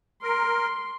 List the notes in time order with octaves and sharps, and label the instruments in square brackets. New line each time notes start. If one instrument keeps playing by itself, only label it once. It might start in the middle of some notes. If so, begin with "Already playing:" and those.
[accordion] A#4 [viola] C6